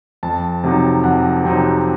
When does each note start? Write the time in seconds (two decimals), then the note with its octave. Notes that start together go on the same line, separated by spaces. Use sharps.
0.23 F2 A5
0.64 C3 F#3 C4 D#4
1.04 F2 F#5
1.44 C3 F#3 C4 D#4